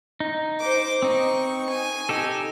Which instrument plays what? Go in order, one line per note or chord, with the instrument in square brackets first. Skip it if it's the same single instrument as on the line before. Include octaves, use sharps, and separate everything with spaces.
[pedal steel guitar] D#4
[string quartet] C5 D6
[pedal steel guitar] C4 D#4 [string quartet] C#6
[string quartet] G#5
[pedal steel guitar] D#4 G4 A4